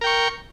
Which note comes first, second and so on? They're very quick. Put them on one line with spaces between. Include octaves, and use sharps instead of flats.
A#4 G5 C#6